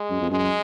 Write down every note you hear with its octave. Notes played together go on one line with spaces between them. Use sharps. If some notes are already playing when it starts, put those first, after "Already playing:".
Already playing: G#3
F#2
F2
F#2 G#3